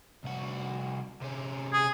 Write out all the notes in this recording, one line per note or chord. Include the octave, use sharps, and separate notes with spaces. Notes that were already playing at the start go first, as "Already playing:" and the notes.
C2 F#4
C3 C#4
G#4